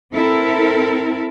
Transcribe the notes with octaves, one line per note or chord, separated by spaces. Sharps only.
C4 E4 A4 A#4